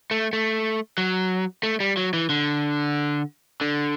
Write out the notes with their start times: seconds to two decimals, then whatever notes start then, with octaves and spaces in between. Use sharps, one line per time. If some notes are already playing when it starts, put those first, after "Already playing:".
0.11 A3
0.33 A3
0.98 F#3
1.63 A3
1.80 G3
1.97 F#3
2.13 E3
2.29 D3
3.61 D3